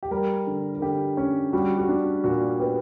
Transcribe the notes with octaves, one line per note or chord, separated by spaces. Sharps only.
G4
G3 A#4
D3
A#4
D3 G4
C#4
G3 F#4
F#4
D4
A#2 F#4
B3 G4